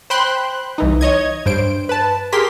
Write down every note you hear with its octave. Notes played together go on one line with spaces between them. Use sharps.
C5 G5 B5 C6 F#6
C2 E3 D#4
C#5 D#5 G#6
G2 C5 D7
B4 A5
G4 G#4 A#4 C6 B6